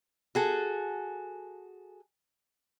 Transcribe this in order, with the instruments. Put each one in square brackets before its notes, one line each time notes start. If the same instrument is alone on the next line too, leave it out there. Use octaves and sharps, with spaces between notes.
[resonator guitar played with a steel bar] F#4 G#4 A4